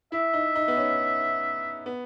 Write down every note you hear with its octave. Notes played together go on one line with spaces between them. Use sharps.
E4 E5
D#4
D#4
B3
C#4
B3